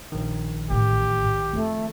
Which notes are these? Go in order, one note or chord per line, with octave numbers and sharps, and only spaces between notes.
A#1 D#3
A1 A2 G4
F2 D#3 A3